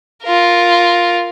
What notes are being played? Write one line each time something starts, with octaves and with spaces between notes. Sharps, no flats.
F4 A#4